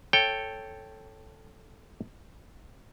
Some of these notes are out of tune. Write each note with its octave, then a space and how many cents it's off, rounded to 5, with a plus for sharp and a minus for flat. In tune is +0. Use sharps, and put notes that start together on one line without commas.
A4 +0 C#5 -10 G5 +0